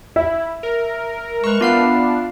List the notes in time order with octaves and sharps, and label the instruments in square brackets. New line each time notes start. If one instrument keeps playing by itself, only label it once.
[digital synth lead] E4 [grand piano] E5
[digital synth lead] A#4
[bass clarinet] G#3 [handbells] A#4 B4 [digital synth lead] C#6
[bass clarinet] B3 [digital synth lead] D4 [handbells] F4 F5 F6